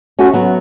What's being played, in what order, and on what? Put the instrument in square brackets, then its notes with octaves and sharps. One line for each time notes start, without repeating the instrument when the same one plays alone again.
[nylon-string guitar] A3 C#4 [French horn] F#4
[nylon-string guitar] F#3 B3